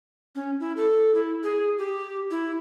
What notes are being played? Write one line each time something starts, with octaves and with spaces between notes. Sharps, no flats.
C#4
E4
A4
E4
G#4
G4
E4